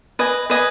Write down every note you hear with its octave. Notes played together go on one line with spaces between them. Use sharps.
B4 D#5 G#5
B4 D#5 G#5